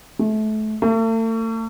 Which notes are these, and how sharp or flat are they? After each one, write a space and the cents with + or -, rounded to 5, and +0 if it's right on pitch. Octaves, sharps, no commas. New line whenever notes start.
A3 -30
A3 +40